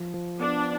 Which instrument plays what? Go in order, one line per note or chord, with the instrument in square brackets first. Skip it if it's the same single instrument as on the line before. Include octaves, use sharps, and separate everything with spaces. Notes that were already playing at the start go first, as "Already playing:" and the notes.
Already playing: [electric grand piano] F3
F3
[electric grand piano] B3 [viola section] D4